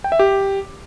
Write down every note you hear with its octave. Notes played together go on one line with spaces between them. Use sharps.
G5
E5
G4